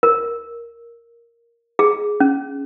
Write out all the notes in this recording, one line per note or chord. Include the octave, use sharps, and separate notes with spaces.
A#4
G#4
C#4